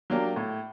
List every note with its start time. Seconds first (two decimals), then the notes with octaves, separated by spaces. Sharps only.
0.10 F#3 A#3 D4 G4
0.36 A2